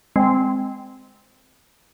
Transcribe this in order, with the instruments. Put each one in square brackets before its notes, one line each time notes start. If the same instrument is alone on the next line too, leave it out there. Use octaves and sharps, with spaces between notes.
[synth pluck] G#3 C4